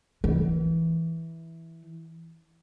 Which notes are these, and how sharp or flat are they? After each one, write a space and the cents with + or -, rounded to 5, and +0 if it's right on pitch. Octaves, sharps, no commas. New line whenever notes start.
E3 -5